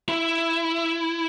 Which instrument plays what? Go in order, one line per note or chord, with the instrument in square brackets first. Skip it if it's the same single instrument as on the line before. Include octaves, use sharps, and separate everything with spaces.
[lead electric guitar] E4